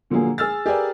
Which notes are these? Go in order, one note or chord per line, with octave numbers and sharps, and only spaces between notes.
A#2 D3 F3 F#3 A#3 G#4
G#4 E6 F6 A6
G4 G#4 A#4 B4 D5 G#5